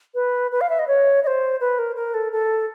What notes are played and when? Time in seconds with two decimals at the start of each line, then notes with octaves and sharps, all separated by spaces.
0.15 B4
0.52 B4
0.61 F5
0.69 E5
0.79 D#5
0.87 C#5
1.24 D#5
1.27 C5
1.60 B4
1.79 A#4
1.96 A#4
2.14 A4
2.32 A4